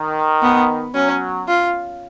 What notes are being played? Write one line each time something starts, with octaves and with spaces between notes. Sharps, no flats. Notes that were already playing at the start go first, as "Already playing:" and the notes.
Already playing: D#3
B3
F#3 C#4
F4